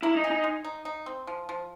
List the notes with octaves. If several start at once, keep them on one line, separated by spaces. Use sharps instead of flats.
A#3 E4
D#4
G#4
D#4
G#3
D#4
D#4
C4
F3
F3